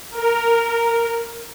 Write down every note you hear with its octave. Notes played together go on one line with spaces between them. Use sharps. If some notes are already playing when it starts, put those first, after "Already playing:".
A#4